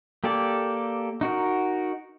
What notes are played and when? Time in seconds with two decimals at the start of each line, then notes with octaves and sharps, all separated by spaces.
0.24 A#3 G4 A4 D5
1.21 D#4 F#4 A#4